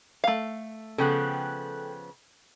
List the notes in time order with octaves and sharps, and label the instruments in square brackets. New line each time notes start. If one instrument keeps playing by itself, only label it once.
[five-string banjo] A3 F5
[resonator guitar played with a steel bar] C#3 F3 B3 [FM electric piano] A4 G5 F#6